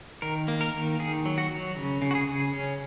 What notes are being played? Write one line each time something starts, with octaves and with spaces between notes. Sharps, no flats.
D#3 A#4
A#3
A#4
D#3
D#3 G#4
F#3
F#4
F#3
C#3
C#3
F#4
G#4
C#3
C#4